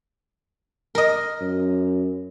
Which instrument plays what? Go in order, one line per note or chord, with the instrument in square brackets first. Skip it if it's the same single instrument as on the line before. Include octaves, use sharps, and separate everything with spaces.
[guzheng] A#4 D#5
[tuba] F#2